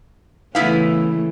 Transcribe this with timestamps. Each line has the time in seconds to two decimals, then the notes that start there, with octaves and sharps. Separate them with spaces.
0.55 C#3 E3 A3 B3 E4 F5